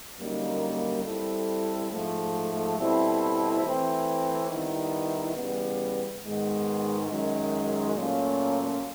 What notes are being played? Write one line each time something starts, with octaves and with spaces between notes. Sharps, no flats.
F#2 D3 G3 A#3 D#4
G3 C4 E4 A4
G#2 F3 A3
B2 G3 C4 E4 A4
E3 A3 C4
D#3 G3 B3 E4
C#3 E3 G3 B3
G#2 D#3 G#3 B3
F#2 D#3 G#3
A#2 F#3 A3 C#4 F4